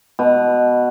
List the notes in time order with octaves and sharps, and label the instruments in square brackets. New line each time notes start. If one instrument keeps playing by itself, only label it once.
[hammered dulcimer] B2